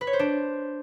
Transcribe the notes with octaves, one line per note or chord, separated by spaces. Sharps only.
B4
C#5
C5
D4